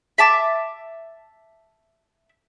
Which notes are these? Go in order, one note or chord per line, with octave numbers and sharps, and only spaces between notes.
E5 A5 D6